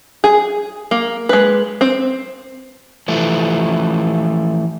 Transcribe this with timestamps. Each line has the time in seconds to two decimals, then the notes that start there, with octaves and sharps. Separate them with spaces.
0.24 G#4
0.91 A#3
1.29 G#3 B4
1.81 C4
3.08 E3 F3 A3